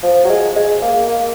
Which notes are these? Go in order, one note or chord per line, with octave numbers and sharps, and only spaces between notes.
F3
F#3
G#3
G#3
A#3
A#3